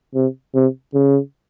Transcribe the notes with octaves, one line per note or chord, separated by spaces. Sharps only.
C3
C3
C#3